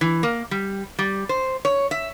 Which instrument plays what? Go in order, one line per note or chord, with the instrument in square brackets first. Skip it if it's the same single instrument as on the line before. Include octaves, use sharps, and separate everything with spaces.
[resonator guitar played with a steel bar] E3
A#3
G3
G3
C5
C#5
E5